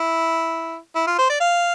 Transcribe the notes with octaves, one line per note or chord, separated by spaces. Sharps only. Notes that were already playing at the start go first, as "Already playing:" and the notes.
Already playing: E4
E4
F4
C5
D5
F5